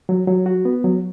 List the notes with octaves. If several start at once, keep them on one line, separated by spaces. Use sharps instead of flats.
F#3
F#3
F#4
B3
F#3